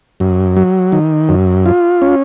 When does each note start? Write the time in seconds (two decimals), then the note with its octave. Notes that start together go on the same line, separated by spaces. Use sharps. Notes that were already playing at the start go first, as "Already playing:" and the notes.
0.20 F#2
0.56 F#3
0.92 D#3
1.29 F#2
1.66 F4
2.02 C#4